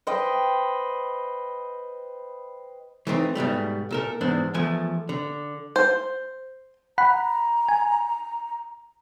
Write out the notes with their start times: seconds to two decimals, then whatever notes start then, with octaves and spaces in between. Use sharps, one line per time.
0.07 B4 C5 D#5 G5
3.07 E3 A3 C4 D#4
3.35 G#2 B2 G3 A3
3.91 A#2 A4 A#4
4.21 E2 G#2 D4 C5
4.54 E2 E3 F3 A3 G#5
5.09 D3
5.76 C5
6.98 F#5 A#5 B5
7.69 G#5